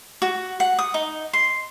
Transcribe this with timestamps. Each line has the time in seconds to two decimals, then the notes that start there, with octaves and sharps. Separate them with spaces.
0.22 F#4
0.60 F#5
0.79 D#6
0.94 D#4
1.33 C6